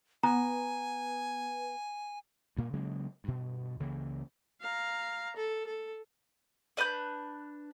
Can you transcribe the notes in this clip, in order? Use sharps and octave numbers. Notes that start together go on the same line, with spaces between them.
B3 G#5 A#5
G2 A#2 A#3
C#3 F#3 G#3 A#3
G2 B2
C#2 C#3 E3 A#3
F5 A#5
A4
A4
D4 B4 B5 G6